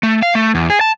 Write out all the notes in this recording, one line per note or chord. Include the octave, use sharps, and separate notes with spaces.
A3
F5
A3
E2
G#4
A5